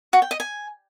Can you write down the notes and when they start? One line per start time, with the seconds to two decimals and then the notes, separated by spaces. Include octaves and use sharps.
0.13 F#4
0.22 G5
0.31 D#5
0.40 G#5